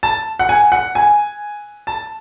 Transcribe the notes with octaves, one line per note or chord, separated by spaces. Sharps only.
A5
F#5
G#5
F#5
G#5
A5